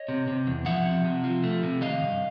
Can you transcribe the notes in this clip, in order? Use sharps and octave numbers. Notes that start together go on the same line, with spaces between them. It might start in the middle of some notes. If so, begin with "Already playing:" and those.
Already playing: C#5 D#5
C3
C3
E2
F3 E5 F#5
C3
C3
F3
A3
C3
D#3 D#5 F5
G2